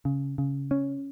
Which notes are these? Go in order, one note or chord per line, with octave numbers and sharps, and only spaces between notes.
C#3
C#3
C#4